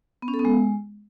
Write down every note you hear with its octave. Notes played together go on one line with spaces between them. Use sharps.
B3
C#4
A4
B3
G#3